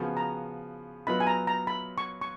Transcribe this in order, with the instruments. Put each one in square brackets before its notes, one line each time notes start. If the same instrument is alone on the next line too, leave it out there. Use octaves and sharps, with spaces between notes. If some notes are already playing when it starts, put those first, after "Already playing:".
Already playing: [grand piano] C#3 F3 B3 F#4
[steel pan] A#5
[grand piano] F#3 B3 F4 B4 D#5 [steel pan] B5
[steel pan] G#5
A#5
A#5
B5
C#6
C#6